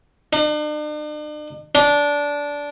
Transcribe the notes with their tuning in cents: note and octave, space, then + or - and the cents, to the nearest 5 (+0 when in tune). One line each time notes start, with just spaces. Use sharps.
D4 +45
D4 -15